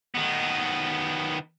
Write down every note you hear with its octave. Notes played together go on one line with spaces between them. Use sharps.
D#3 B3